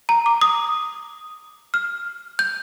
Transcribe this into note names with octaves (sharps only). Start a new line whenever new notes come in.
A#5
D6
D#6
F6
G6